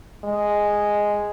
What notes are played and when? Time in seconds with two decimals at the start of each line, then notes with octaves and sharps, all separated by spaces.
0.25 G#3